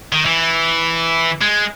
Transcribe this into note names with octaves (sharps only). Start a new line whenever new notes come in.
D#3
E3
G#3